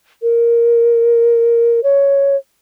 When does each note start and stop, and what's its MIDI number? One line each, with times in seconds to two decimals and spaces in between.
0.22 1.83 70
1.83 2.36 73